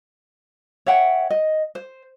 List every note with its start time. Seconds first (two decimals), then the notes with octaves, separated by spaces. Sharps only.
0.86 C#5 E5 F#5 G5
1.30 D#5
1.75 C5